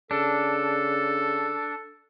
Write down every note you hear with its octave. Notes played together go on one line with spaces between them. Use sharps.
C#3 D4 A4